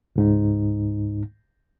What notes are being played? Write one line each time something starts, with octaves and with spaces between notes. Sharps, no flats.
C#2 G#2 D#4